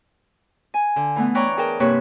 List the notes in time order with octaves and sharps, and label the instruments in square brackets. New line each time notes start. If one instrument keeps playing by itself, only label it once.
[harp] G#5
D3
E3 A3 B3
B4 C#5 D5 G5 A#5 C#6
G#4 A#4 G5 A5
G2 C3 A#3 B4 C#5 C#6